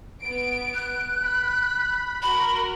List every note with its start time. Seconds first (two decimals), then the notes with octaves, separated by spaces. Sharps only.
0.22 B3 D7
0.74 F#6
1.24 B5
2.23 F#4 A#4 B5